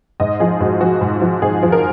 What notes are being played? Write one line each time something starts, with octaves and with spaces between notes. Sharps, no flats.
G#2 D#5
F3 G#4
G#2 F#4
F3 F#4
G#2
F3
G#2 G#4
F3
A#4